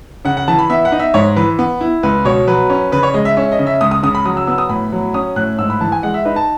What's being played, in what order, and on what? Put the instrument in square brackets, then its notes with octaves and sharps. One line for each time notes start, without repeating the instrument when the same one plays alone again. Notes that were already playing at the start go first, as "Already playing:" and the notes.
[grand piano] C#3 F#5
F#5
E3 A5
B5
B3 E5
F#5
D#4
E5
G#2 C#5
E3 B4
B3
E4
C#2 B4
B2 C#5
F#3 B4
C#4
C#3 B4
C#5
G#3 D#5
E5
C#4 E5
D#5
C#3
E5
C#2 D#6
D#6
C#3 D#6
B5
F#3 D#6
E6
B3 E6
D#6
A2 B5
F#3
C#4 D#6
A2 F#6
G#2 E6
B5
E3 A5
G#5
G#3 F#5
E5
D#4 B4
A5